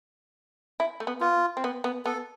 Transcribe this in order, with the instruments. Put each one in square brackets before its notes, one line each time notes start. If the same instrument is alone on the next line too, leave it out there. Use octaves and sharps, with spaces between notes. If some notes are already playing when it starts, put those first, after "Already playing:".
[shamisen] E4
A3
B3
[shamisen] B3 [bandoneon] F4
[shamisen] C4
B3
B3
[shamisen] B3 [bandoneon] A4